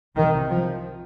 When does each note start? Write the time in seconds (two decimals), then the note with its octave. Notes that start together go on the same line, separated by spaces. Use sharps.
0.15 C2 C3 D#3
0.49 F3